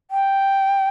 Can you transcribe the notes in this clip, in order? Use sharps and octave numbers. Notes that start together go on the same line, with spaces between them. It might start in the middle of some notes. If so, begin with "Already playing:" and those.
G5